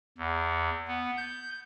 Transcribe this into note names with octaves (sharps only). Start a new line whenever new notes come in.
E2
B3
G6